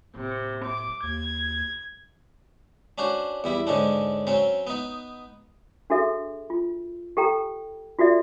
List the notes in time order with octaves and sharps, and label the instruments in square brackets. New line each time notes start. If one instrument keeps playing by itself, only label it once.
[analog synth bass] D1 [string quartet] C3
[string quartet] D6
[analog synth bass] D#2 [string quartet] G#6
[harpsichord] C#4 D4 F#4 C5
E2 G3 E4
G#2 D3 C#4 D4
F#3 C4 C#4
B3 D#4
[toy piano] D4 F#4 G#4 A4 E5
F4
G4 A4 G5 A#5
F4 F#4 A4 D5 E5